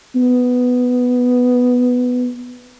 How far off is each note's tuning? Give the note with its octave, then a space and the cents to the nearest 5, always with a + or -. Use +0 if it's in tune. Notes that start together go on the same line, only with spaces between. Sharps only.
B3 +5